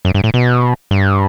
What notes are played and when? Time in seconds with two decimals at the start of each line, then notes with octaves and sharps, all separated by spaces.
0.05 F#2
0.14 G2
0.24 A2
0.34 B2
0.91 G2